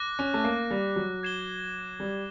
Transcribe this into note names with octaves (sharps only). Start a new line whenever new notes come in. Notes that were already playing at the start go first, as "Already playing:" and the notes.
Already playing: D6 F#6 A#6
C#4
A3
A#3
G3
F#3
G#6 C7 E7 G7
G3